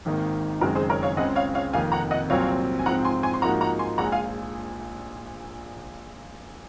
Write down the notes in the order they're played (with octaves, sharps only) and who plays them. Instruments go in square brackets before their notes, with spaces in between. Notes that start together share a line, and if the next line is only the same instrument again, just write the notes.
[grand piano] G#1 G#2 D#3 A#3 D#4
[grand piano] F#1 F#2 D#3 G#3 C4 [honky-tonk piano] F#4 A#4
[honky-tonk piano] G#4 C5
A#4 C#5
C#5 F5
[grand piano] C#2 C#3 G#3 C4 [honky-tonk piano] D#5 F#5
[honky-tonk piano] C#5 F5
C#5 F5
[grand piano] F1 F2 D#3 A#3 [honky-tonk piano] F5 G#5
[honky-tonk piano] F#5 A#5
D#5 F#5
[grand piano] C2 A#2 F#3 C4 [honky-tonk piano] C#5 F5
[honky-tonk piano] G#5
[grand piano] G#2 F3 C4 [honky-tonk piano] F#5 A#5
[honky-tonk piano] G#5 C6
G#5 C6
C6
[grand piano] G#2 F3 A#3 D#4 F#4 [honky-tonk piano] F#5 A#5
[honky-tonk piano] F#5 A#5
G#5 C6
[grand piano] A#1 A#2 F3 G#3 [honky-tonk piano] F#5 A#5
[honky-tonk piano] F5 G#5